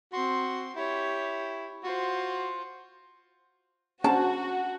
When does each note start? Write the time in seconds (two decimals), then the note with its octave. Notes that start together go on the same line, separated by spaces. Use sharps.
0.13 C4 F#4 C6
0.76 E4 G4 C#5
1.84 F4 F#4 C5
4.04 C#4 D4 F#4 C5 A5